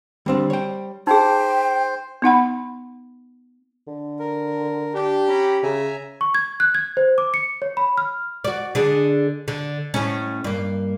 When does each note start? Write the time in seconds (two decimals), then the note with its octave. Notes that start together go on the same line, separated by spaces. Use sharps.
0.26 D3 G3 C4 D4 C5
0.50 C#5 G5
1.07 D#4 G#4 C5 G5
2.22 B3 D#4 F#5 B5
3.87 D3
4.19 A#4
4.94 D4 G4
5.28 C#4 A#5 B5
5.63 C#3 E5 G#5 A#5
6.21 C#6
6.34 G#6
6.60 F#6
6.75 G#6
6.97 C5
7.18 D6
7.34 C#7
7.62 C#5
7.77 B5
7.98 F6
8.44 F#4 D5
8.75 D3 D4 G#4
9.48 D3
9.94 A2 C#4
10.44 G2 A#3